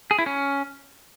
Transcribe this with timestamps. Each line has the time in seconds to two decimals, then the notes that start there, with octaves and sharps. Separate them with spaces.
0.11 G#4
0.19 E4
0.26 C#4